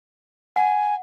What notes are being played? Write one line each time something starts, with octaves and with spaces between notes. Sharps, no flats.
F#5 G#5